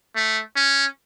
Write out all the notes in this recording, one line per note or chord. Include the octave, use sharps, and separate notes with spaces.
A3
C#4